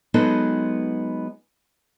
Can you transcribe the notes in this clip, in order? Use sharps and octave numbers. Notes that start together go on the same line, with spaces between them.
F#3 G#3 B3 D#4 G#4 A4